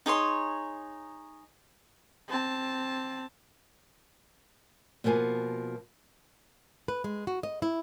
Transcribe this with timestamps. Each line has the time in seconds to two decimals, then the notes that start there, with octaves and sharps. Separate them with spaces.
0.06 D#4 G#4 C#5 C6
2.28 C4 A5
5.04 B2 F3 A#3 B3 G#5
6.88 B4
7.04 G#3
7.27 F#4
7.43 D#5
7.62 E4